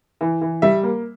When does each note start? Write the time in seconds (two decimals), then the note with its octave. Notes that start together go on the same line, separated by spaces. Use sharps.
0.21 E3
0.41 E3
0.62 G3 E5
0.83 A#3